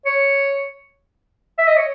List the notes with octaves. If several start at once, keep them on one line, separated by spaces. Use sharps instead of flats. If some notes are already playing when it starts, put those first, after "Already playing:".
C#5
E5
D#5
C#5